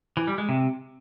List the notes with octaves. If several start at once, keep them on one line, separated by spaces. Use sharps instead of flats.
E3
G3
G#3
C3